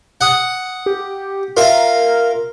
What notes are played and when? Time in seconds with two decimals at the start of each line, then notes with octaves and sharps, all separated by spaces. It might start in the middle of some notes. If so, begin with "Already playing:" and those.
0.21 F#5 D#6
0.86 G4
1.57 F4 A#4 E5 F5